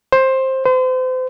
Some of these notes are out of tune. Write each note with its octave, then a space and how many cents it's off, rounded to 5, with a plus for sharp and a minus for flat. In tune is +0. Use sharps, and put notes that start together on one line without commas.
C5 +15
C5 -35